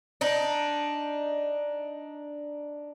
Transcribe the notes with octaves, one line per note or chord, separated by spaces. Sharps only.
D4 D#4